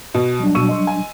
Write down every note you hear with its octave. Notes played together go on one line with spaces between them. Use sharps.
B2
F#3 G3 D4
B2 C#6 E6 D#7
D#5 C6 E6
G#5